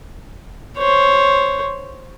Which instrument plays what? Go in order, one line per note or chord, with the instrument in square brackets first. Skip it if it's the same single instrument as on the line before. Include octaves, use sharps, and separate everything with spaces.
[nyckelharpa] C5 C#5